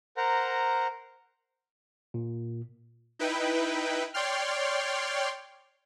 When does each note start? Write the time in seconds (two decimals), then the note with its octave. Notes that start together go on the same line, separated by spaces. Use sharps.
0.17 A#4 C5 F#5 A#5
2.14 A#2
3.19 D#4 E4 B4 G5
4.14 C#5 D5 G5 C6 F6